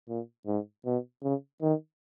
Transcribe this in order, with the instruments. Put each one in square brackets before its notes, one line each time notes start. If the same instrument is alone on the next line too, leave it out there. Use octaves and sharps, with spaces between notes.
[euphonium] A#2
G#2
B2
C#3
D#3